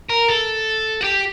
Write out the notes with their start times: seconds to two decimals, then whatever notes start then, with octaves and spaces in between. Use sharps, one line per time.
0.10 A#4
0.28 A4
1.01 F#4
1.04 G4